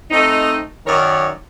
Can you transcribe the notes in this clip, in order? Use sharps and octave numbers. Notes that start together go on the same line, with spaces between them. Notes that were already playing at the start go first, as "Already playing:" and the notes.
A3 C4 D#4
F#2 D#3 A#4 C#5 D5